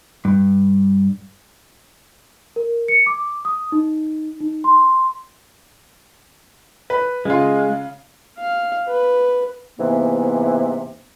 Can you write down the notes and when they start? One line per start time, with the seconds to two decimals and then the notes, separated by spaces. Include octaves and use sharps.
0.25 G2
2.56 A#4
2.88 C#7
3.06 D6
3.45 D#6
3.72 D#4
4.40 D#4
4.64 C6
6.90 B4
7.25 C#3 G#3 F4
8.38 F5
8.87 B4
9.78 G#2 C3 E3 A#3 B3